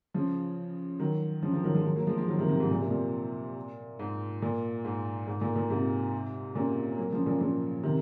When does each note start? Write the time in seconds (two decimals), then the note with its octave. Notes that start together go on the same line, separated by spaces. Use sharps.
0.14 C#3 F3
1.00 D#3 F#3
1.43 C#3 F3
1.53 C#3 F3
1.64 D#3 F#3
1.75 F3 G#3
1.85 D#3 F#3
1.96 F#3 A#3
2.07 F3 G#3
2.17 F3 G#3
2.28 D#3 F#3
2.39 C3 D#3
2.49 C3 D#3
2.60 G#2 C3
2.71 A#2
2.81 C3
2.90 A#2
3.99 G#2
4.42 A#2
4.85 G#2
5.27 G#2
5.41 A#2
5.56 A#2
5.70 G#2 C3
6.55 A#2 C#3
6.98 F#3 A#3
7.12 C#3 F3
7.26 A#2 C#3
7.41 A#2 C#3
7.83 C3 D#3